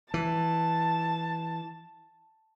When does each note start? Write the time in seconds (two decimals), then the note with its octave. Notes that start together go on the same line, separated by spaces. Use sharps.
0.14 E3 A5